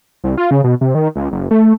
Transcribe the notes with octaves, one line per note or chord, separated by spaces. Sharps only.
C2
F4
C#3
B2
C3
D#3
C#2
F#1
A3